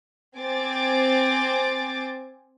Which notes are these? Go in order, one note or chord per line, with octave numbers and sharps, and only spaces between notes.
C4 C5 G#5 D6 A6